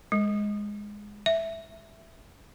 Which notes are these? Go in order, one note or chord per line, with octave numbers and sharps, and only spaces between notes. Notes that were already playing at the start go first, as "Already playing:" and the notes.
G#3
E5